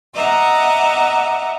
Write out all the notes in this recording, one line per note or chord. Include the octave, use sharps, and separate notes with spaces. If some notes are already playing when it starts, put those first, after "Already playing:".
D#5 E5 F#5 A#5 D6